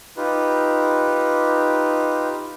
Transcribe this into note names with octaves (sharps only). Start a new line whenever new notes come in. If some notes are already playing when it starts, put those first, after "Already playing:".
D#4 F4 G4 B4